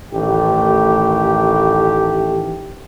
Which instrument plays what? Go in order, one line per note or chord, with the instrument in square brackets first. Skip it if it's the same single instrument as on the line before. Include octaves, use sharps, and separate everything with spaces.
[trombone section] A1 D#3 A3 G4